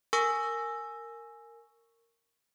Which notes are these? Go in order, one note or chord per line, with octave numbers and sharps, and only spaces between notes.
A#4 G#5 C#6 E6 A#6